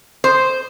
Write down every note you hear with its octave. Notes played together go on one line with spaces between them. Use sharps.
C5